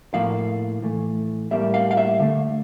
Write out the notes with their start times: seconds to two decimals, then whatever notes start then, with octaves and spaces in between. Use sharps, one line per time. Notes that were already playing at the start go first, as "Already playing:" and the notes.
0.13 A2 F3 A#3 F5
0.82 A2 E3 A3
1.51 A2 G3 A#3 E5
1.74 F5
1.91 F5
1.97 E5
2.20 D3 A3